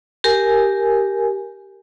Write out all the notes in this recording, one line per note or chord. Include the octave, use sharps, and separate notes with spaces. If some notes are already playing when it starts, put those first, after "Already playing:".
G4 A#4 G#5